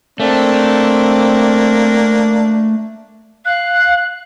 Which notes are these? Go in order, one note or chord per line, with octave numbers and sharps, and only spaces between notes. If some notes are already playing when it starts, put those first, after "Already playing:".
A3 A#3 C4 D4
F5 F#6